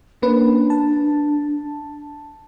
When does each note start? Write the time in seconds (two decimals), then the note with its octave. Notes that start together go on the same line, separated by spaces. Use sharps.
0.22 A#3 C#4 D4 B4
0.70 A5